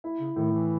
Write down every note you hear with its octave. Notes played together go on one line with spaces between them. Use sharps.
E4
C#3
A2 D#3
E3